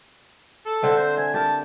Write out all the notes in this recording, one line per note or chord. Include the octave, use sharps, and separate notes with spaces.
A4
D3 C4 E5
C5
E5 G#5
G4 A#4 A5